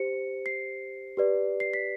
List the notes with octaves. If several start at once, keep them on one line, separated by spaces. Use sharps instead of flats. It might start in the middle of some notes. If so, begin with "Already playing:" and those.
Already playing: G4 C5 C#7
C7
G4 B4 D5
C7
B6